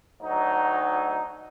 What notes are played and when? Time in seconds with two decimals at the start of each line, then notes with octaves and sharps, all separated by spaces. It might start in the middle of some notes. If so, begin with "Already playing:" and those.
0.22 D2 F#3 D#4